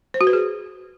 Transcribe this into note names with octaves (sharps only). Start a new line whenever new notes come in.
C5
F#4
B4
G#4